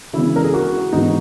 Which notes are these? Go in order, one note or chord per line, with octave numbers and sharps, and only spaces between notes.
C#3 E3 G#3 B3 E4
A#4
G#4
F#4
G#2 E3 G#3 B3 D#4